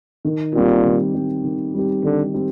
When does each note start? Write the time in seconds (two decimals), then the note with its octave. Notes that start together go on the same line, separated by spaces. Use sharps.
0.25 D#3
0.55 A#2 G3 C4 G4
0.85 D#3
1.14 G3 C4 G4
1.44 D#3
1.74 G3 C4 G4
2.03 D3 D#3
2.34 G3 C4 G4